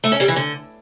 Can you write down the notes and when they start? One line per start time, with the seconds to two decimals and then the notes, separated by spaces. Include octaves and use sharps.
0.04 A3
0.12 C#4
0.20 G3
0.28 E3
0.36 D3